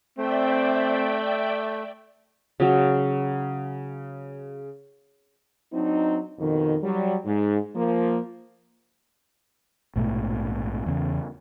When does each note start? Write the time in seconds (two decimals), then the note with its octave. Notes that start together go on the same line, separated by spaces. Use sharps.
0.18 A3 C4 D5 E5 G5
2.60 C#3 F#3
5.73 F#3 C4 D4 D#4
6.39 F2 B2 D#3
6.83 F#3 G3
7.25 G#2
7.74 F3 A#3
9.96 A#1 G#2 B2 A3
10.86 E2 C#3